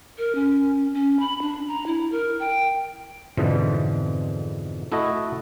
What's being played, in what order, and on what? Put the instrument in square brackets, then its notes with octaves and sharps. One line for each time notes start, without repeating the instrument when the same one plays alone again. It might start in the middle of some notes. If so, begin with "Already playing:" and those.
[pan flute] A#4
C#4
C#4
B5
D4
A#5
E4
A#4
G5
[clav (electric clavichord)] F2 G#2 B2 D3 E3
A3 E4 F#4 A4 D#5